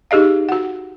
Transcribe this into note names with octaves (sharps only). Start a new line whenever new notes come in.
D#4 G4 G#4 D#5 F5
F#4 F#5